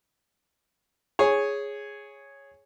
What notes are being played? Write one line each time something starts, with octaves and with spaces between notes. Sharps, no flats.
G#4 C#5